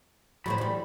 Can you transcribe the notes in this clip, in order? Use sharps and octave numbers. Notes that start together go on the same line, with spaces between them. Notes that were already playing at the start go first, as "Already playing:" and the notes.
A2 E3 F#3 A3 C4 B5
G2 G3